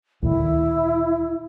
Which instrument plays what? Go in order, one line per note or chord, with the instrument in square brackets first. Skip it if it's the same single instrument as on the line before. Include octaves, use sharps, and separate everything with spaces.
[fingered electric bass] D2 A#2 D#3 [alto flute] E4